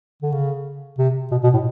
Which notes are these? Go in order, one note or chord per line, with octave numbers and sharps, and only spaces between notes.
D3
C#3
C3
B2
B2
A2